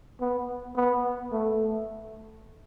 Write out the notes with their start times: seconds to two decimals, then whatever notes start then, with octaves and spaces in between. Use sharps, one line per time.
0.20 B3
0.76 B3
1.32 A3